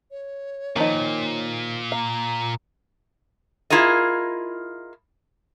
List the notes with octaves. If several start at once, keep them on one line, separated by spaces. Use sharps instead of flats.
C#5
A#2 D#3 F3 D#4
F5 A#5
E4 F4 G#4 A#4 D#5